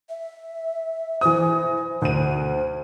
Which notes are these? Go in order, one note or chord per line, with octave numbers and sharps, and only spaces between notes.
E5
E3 C5 D#6
D2 C5 D#7